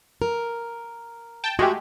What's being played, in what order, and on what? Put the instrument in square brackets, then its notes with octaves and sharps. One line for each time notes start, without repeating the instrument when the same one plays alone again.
[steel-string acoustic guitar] A#4
[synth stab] G5 A5
[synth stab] G#3 A3 G4 [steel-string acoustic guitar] F#4